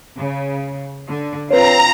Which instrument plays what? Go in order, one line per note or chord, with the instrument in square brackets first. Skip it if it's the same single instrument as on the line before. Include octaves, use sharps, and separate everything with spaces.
[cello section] C#3
D3
[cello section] C4 F4 [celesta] B4 C#5 [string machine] A#5